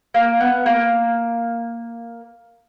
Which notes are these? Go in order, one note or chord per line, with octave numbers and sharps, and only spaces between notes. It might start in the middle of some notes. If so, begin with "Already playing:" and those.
A#3
B3
A#3